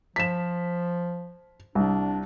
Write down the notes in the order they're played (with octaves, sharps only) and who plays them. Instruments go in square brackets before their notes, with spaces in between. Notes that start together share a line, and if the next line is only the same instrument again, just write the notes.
[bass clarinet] F3 [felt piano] B6 E7
[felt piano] C2 [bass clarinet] D4